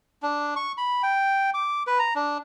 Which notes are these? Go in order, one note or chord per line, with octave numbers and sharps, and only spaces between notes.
D4
C#6
B5
G5
D6
B4
A#5
D4